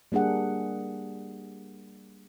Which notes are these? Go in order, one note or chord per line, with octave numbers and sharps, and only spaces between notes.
G3 A#3 D4 G#4 F#5